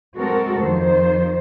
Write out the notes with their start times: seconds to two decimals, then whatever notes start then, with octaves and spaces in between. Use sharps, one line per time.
0.17 G#3 C4 F#4 A4 A#4
0.60 F2 D#3 C5